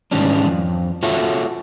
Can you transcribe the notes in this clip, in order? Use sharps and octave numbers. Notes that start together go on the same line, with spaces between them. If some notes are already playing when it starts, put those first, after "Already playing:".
G#2 D#3 E3 G3 C#4 D4
F2
F4 F#4 A4 C#5 E5 F#5